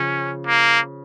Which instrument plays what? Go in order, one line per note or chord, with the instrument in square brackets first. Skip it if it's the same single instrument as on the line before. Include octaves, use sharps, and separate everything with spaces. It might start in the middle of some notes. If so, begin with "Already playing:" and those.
Already playing: [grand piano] C#3 F3 [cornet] C#4
[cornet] A#3